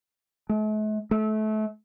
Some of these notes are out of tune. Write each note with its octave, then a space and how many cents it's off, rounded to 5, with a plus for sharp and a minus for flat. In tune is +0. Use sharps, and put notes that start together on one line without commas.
A3 -45
A3 -30